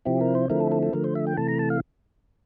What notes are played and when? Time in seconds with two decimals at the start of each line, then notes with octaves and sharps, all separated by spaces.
0.05 C3 F3 C4 E4 G4
0.21 A#4
0.35 C5
0.50 D3 F3 A3 C4 E4 A#4
0.60 A4
0.72 A4
0.83 A4
0.93 D3 F3 A3 A#4
1.04 C5
1.15 E5
1.27 G5
1.37 C3 E3 A3 A5
1.48 A#5
1.59 A5
1.70 F5